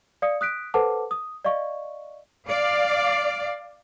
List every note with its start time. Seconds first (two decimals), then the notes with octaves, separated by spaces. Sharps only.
0.22 D5 F5 D#6 C#7
0.41 D#6 F#6 B6 D7
0.74 A4 B4 C5 F#5 A5 D6
1.11 D#6
1.45 D5 D#5 F5 C#6
2.49 D5 F5